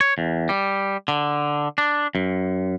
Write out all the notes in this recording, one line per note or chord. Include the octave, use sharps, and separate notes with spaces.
C#5
E2
G3
D3
D4
F#2